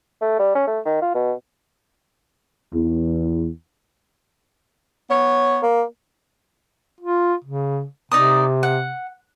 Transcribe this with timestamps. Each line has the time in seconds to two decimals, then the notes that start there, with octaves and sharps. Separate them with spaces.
0.22 A3
0.39 G3
0.55 C#4
0.67 A3
0.85 D#3
1.02 F4
1.15 B2
2.74 E2
5.08 B3 C#5
5.63 A#3
7.01 F4
7.44 C#3
8.12 C3 D#4 D5 D#6
8.63 F#5